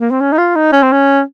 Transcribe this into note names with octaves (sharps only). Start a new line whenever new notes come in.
A#3
C4
C#4
D#4
F4
D#4
C#4
C4
C#4